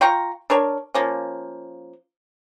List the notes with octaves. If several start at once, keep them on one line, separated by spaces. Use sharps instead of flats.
F4 G5 A#5 C#6
D4 A#4 C#5
F3 A#3 C#4